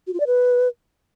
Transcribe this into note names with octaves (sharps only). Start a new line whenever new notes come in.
F#4
F4
D5
B4